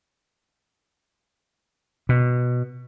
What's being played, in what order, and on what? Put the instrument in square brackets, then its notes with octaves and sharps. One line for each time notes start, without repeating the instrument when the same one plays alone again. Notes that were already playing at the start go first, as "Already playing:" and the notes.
[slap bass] B2